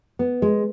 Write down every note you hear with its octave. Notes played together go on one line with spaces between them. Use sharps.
B3
G#3